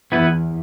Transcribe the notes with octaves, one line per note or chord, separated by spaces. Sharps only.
E2 B3 E4 B4